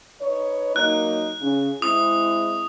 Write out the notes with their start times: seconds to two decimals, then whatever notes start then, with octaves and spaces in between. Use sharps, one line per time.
0.22 D#4 B4 C#5
0.76 F#3 A#3 D#4 F#6
1.41 C#3
1.82 G#3 C4 E4 D#6